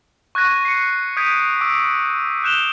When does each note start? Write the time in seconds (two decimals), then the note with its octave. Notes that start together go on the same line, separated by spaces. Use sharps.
0.35 C#6 F#6 G#6 A#6 D#7
0.65 C7 C#7
1.17 D#6 G6 G#6 B6 D7 D#7
1.61 D6 E6 D7
2.44 F#6 G6 E7 F7 G7